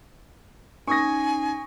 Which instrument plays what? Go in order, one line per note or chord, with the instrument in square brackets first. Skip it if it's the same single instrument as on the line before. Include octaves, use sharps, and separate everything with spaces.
[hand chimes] C#4 D#4 [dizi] G#5 [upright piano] C#6 D#6 A#6